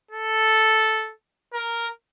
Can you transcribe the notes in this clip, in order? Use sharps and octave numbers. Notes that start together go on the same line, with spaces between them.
A4
A#4